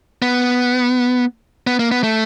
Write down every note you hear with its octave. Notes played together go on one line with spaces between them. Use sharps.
B3
B3
A#3
B3
A3